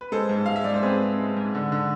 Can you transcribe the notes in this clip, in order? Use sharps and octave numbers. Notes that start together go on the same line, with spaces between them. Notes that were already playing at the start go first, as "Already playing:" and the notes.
B4
G#3 A4 C5
G#2
G#3 F5
E5
G#2 D5
C5
C4 G#4 B4
C4
G#3
G#2
D3
D3